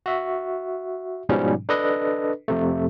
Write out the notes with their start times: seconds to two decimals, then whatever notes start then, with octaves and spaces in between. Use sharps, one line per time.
0.06 F#4 E5
1.29 G#2 B2 F3 G3 C#4
1.69 D4 A4 B4 D#5
2.48 F2 C3 A3